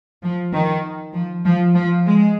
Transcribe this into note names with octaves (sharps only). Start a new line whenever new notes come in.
F3
D#3
F3
F3
F3
G#3